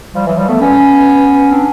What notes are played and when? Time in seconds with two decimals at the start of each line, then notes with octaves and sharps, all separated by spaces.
0.15 F3 G3
0.26 E3 F#3
0.37 F3 G3
0.49 A3 B3
0.60 B3 C#4
1.51 C4 D4